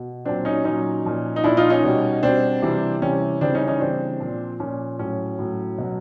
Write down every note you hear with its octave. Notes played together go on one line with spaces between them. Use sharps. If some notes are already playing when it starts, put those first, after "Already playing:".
Already playing: B2
A#2 F#3 C4 D4
C#4 D#4
A#2 F#3 C#4 D#4
A#2 F3
D#4
A#2 F3 D4 E4
D#4 F4
C#4 D#4
B2 G3
B2 G3 C4 D4
C3 E3 G3
C3 E3 G3 C#4
C#3 E3 G3 C4 D4
C#4 D#4
C#4 D#4
C#3 E3 G3 C4 D4
A#2 F3
A#2 F3 C#4
A2 F#3 C#4
A2 F#3
B2 F#3